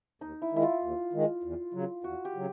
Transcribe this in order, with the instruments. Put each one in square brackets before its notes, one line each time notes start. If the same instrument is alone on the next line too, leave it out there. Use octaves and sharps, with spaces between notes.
[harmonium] D#2 [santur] D#4
[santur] E4
[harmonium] D#3 G#3 [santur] E4
[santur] F4
[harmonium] D#2
D#3 G#3
E2
C#3 F#3
[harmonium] E2 [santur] F#4
[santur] G4
[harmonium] C#3 F#3